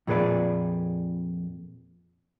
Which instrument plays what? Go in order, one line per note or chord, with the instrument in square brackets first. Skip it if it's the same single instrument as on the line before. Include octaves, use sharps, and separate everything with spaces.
[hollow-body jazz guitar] F2 A#2 G#4 B4 D5